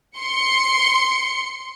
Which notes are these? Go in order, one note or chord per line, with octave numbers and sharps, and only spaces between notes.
C6 C#7